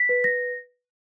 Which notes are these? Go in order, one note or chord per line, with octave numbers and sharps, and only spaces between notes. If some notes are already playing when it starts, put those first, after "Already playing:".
Already playing: B6
B4
A#6